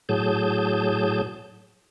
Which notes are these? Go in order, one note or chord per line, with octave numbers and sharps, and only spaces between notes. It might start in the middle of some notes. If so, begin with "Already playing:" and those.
A2 F#3 G#4 A5 G6